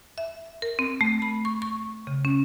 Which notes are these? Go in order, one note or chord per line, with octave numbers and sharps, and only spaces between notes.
E5
A#4
C4
A3
B5
C#6
C#6
C#3
C#4